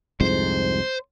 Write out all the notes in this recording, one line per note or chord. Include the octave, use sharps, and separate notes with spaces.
C2 F2 G#2 C5